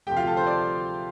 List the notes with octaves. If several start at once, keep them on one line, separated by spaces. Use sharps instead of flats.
D2 C3 F3 A3 G4 G5
F4 F5
A4 A5
C5 C6
D5 D6